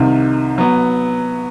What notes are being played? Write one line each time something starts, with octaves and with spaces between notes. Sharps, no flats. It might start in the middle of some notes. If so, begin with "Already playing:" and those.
Already playing: C2 C3 D#3
F#3 B3